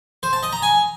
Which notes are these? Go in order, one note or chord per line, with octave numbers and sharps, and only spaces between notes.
C5
A5
D#5
A#5
G#5